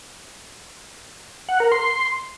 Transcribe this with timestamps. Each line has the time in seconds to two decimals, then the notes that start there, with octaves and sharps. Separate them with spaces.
1.49 F#5
1.60 A#4
1.72 C6